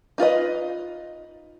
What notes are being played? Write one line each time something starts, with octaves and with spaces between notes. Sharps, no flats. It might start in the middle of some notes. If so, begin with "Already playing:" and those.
D#4 F4 B4 D#5